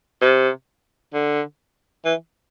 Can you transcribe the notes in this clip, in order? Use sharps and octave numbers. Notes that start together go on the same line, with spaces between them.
C3
D3
E3